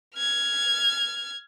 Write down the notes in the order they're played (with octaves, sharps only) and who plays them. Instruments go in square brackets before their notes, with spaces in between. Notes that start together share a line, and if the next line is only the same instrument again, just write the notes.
[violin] F6 G#6